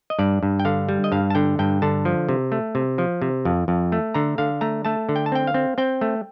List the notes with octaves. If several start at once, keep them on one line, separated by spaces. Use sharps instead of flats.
D#5
G2 D5
G2
G5
D3 F5
G3
D#5
G2 F5
A5
D3 G5
G2 G5
D3 A5
F3
C3
A3
C3
F3
C3
F2
F2
A3
D3 A#5
D3 F5
A3 A#5
A3 A5
D3
G5
A5
C4 G5
F5
C4
C4 G5
A3